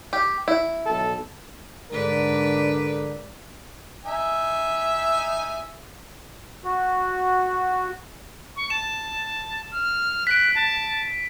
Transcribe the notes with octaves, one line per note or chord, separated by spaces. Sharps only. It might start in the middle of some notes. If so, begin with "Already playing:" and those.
G4
E4
B1 A4
G#2 D3 A#4 B4 D5
D#4 E5 G#5
F#4
C#6
A5 E7
F6
F#6 B6 D7
A5